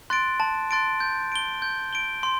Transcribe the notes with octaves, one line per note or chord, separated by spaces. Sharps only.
C6 F#6 A6 D7
A5
C6 F#6 A6 D7
G6
D7 G7
G6
D7 G7
C6